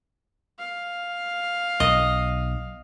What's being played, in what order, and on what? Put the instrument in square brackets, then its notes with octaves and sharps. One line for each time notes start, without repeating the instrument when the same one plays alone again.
[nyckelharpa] F5
[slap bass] B1 [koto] D#5